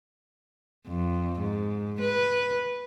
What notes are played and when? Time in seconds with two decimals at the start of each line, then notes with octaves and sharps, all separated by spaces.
0.87 F2
1.40 G#2
2.01 B4